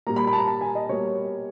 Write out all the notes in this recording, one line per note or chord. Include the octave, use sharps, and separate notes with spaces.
A#2 G3 A#3 A#5
B5
B5
A5
A#5
A5
G#5
D#5
B2 G3 A#3 C#5